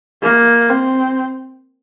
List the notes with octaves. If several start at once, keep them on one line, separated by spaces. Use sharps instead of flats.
A#3
C4